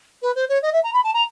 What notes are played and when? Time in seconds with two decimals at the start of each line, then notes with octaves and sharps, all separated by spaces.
0.22 B4
0.35 C5
0.49 C#5
0.62 D#5
0.73 E5
0.83 A#5
0.93 B5
1.04 A5
1.13 A#5